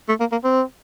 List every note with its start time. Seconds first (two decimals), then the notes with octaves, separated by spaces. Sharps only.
0.09 A3
0.20 A#3
0.32 A#3
0.44 C4